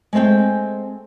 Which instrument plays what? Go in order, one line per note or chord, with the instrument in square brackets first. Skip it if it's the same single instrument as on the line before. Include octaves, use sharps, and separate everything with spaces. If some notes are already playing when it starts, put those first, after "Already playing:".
[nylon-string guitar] G#3 A3 C4 G#4 G5